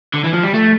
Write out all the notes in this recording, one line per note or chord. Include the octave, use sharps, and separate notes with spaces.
D3
E3
F3
G3
A3